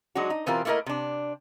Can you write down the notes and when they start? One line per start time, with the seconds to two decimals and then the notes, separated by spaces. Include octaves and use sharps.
0.15 F#3 G#3 D4 D#4 F#4
0.30 D#4
0.46 B2 E3 C4 F4 G4 A#4
0.65 A3 A#3 E4 G4 A#4 D#5
0.86 C3 D4